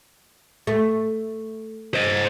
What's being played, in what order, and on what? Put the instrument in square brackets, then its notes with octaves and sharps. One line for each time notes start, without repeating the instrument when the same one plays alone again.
[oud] A3
[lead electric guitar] C5 D#5